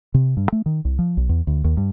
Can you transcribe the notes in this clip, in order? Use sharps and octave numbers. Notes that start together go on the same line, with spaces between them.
C3
G2
A3
D#3
C2
F3
B1
E2
D2
D#2
G2